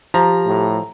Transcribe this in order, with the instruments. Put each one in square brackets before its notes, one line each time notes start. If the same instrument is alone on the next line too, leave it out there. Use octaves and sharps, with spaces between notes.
[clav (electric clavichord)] F3 [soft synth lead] G4 [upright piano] A#5
[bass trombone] A2